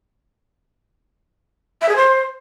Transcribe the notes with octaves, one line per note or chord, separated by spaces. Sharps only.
E5
G#4
C5